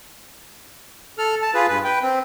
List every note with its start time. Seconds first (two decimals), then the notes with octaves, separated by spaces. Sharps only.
1.18 A4 F6
1.42 A5
1.54 F4 G#4 B4
1.68 G2 B4
1.84 B4 G5
2.03 C4